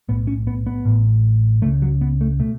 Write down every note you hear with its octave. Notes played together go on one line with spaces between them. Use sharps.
B1 A2 B3
C#4
B3
B3
A1 A2
C#2 C#3 A3
F#3
B3
A3
B2 A3